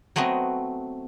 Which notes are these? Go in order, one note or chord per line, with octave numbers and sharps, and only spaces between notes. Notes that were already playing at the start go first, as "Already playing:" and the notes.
F#3 A3 B3 C4 D#5